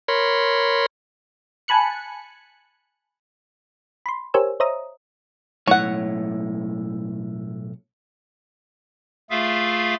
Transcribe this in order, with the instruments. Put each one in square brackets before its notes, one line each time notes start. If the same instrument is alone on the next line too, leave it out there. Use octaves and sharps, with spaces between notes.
[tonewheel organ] A#4 C#5 B5 C6
[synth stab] G#5 A5 B5 F#6 C#7
[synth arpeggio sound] B5 C6
G4 A#4 C5 C#5 G#5 E6
C5 C#5 D#5 E5 A#5 D#6
[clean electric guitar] B1 A2 [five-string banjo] C#5 F#5
[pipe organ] A3 F4 G#4 E5 F5